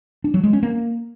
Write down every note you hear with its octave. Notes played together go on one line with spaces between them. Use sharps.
D4
F#3
G#3
C#4
A#3